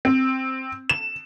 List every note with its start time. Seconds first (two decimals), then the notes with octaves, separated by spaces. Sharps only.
0.05 C4
0.89 E7